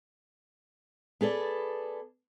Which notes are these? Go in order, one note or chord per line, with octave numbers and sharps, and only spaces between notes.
B3 G#4 A4 D5